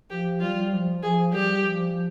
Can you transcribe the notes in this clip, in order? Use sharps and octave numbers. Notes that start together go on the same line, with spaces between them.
F3 G4
G3 F4
F3
F3 G#4
G3 G4
F3